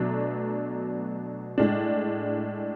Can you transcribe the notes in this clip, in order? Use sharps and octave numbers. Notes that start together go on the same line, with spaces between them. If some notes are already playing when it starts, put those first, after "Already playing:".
Already playing: B2 F#3 A3 D4
A2 G#3 D4